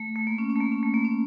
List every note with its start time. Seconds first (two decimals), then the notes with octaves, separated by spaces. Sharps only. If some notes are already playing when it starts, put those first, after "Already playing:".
Already playing: A3
0.16 A3
0.27 A#3
0.38 C#4
0.50 C#4
0.56 A3
0.61 A#3
0.72 C#4
0.83 A3
0.94 A#3
1.05 C#4